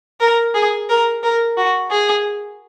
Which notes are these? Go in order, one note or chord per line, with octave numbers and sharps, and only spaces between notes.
A#4
G#4
A#4
A#4
F#4
G#4